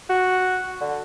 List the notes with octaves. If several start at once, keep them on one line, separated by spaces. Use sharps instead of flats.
F#4
D3